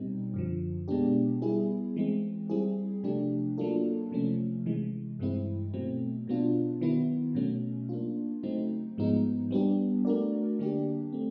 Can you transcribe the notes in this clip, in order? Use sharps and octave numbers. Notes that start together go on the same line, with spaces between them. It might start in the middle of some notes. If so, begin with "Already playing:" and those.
Already playing: B2 G3 C4 D#4
F#2 D3 F3
B2 G#3 B3 D4 G4
G3 B3 E4 G#4
E3 G#3 C4
G3 C4 E4 G#4
C3 F3 A3 D4 G4
F#3 A#3 D4 F4 A4
C3 F3 A3 C#4
C3 E3 G#3
G2 E3 G#3 C4 E4
B2 F#3 A3 C4
B2 F#3 B3 D4 F4
D#3 F#3 B3 E4
B2 F#3 A3 C#4
A#3 D4 F4
C#3 F#3 A3 C4 D#4
G#2 F3 G#3 B3 D#4
G3 B3 D4 G4
A3 D4 F#4 A#4 D5
D3 F#3 A#3 D4 G4
A3 C4